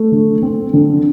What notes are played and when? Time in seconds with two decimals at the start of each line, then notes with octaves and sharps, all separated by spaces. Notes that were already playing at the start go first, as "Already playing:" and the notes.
Already playing: A3
0.12 D3
0.43 C4
0.74 D3